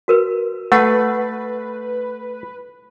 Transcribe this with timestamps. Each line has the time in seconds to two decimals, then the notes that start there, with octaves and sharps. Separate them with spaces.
0.08 F#4 A#4 B4
0.72 A3 B4 F#5